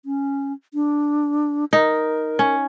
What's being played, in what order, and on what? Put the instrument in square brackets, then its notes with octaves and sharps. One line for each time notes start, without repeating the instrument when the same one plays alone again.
[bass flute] C#4
D4
[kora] D#4 [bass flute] A#4
[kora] C#4